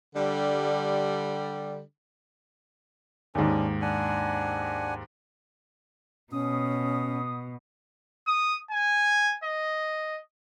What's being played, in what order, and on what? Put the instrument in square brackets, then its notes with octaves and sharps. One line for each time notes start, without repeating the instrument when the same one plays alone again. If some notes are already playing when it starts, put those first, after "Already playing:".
[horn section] D3 G3
[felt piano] D#2 G#2 [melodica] C#4 D4
[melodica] D4 F#5 G#5
[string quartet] B2 [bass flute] C#4 [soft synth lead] D#6
[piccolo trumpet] D#6
G#5
D#5